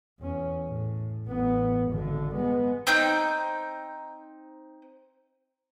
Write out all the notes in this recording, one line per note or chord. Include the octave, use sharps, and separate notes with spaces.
E2 C#4
A2
A1 B3
G#1 D3
G#3 B3
C4 D#4 G5 G6